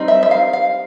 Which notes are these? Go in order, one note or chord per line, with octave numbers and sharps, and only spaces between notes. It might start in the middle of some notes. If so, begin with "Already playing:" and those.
Already playing: G3 C4 D#4
E5
E5
F5
F5